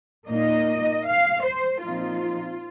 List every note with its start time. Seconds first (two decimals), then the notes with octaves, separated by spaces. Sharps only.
0.28 A#2 A#3 D#4 D#5
1.06 F5
1.44 C5
1.82 A#2 F3 C4 D#4 F4